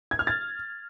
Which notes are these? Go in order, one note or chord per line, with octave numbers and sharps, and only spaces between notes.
G#6
F6
A6